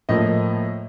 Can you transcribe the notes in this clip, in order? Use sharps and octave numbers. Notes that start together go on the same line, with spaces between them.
A2 F3 A#3 D#5